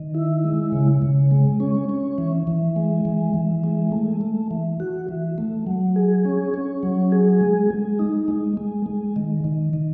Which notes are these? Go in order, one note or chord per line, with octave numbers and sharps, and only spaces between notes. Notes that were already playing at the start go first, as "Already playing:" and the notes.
Already playing: D#3
E4
G#3
C#3
C#3
G#3
C#4
C#4
E3
E3
G#3
E3
E3
G#3
A3
A3
E3
F#4
E3
A3
F#3
G#4
C#4
C#4
F#3
G#4
G#3
G#3
D#4
G#3
G#3
G#3
D#3
D#3
D#3